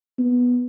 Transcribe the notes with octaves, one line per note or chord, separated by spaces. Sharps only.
B3